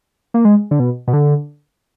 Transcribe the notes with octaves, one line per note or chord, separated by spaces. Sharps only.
A#3
G#3
D3
B2
B2
D3